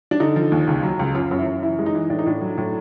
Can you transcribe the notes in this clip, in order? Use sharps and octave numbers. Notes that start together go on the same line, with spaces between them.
D4
D3 D#4
F3
D#2
C#2
F#3
C#2
F#2 F4
F#2
E4
F#2
E3 E4
G#3
D#4
E3
A2 D4
D#4
A2 D4
F#3
A2